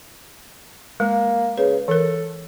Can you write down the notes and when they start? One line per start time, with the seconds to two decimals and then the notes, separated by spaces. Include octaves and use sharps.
1.00 G#3 A#3
1.57 C#3 B4
1.88 E3 A4 A#4